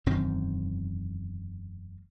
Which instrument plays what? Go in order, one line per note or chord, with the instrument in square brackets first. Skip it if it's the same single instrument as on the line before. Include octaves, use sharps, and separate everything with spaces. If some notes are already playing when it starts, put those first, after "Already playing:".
[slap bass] E1 F#2 D#3 C4